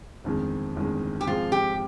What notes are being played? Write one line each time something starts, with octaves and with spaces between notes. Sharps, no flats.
G1 F2 D#3 G#3
G1 F2 D#3 G#3
G4
G#2 F3 G#3 C4 F4
G4